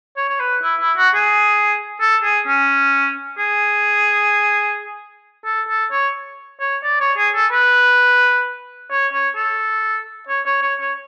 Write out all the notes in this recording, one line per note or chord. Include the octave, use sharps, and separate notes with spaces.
C#5
C#5
B4
E4
E4
F#4
G#4
A4
G#4
C#4
G#4
A4
A4
C#5
C#5
D5
C#5
G#4
A4
B4
C#5
C#5
A4
C#5
C#5
C#5
C#5